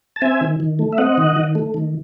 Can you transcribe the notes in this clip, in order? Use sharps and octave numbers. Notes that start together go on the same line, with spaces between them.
A5
C4 E5 G#5
D#3
D#3
A3
E5
C4 D#5 F#5
D#3
D#3
A3
D#3